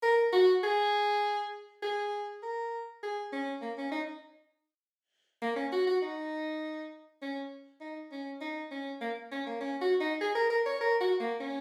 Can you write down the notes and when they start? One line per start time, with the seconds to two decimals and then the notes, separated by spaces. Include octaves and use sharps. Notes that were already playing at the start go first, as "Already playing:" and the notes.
0.03 A#4
0.32 F#4
0.63 G#4
1.82 G#4
2.43 A#4
3.03 G#4
3.33 C#4
3.62 A#3
3.78 C#4
3.91 D#4
5.42 A#3
5.56 C#4
5.72 F#4
5.87 F#4
6.02 D#4
7.22 C#4
7.81 D#4
8.12 C#4
8.41 D#4
8.71 C#4
9.01 A#3
9.31 C#4
9.46 A#3
9.61 C#4
9.81 F#4
10.00 D#4
10.21 G#4
10.35 A#4
10.50 A#4
10.66 C#5
10.81 A#4
11.00 F#4
11.20 A#3
11.40 C#4